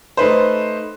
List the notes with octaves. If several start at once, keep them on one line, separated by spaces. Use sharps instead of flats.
A3 D#4 B4 C5